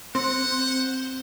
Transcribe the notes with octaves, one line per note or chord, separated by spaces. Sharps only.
C4 F#5